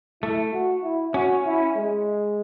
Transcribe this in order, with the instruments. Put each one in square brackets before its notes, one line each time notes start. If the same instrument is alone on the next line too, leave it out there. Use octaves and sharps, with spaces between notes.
[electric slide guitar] A3 [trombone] E4
[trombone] F#4
E4
[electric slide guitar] C#4 [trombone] F#4
[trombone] E4
G#3